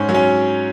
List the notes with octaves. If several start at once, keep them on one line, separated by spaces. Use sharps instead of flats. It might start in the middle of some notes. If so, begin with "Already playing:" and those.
Already playing: G#2 C#4
F#3
C#4